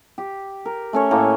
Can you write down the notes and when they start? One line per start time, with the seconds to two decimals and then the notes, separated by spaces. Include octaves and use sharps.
0.18 G4
0.66 A#4
0.93 A3 C#4 C#5
1.11 A2 A#3 A4 G#5